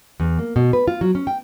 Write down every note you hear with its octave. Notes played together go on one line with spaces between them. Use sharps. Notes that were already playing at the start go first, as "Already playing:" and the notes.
E2
A#3
B2
B4
F4
F#3
C#4
G5